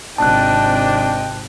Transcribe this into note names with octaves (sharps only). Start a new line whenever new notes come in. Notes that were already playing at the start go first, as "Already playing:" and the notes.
G#1 C3 D4 D#5 G5 A5 F#6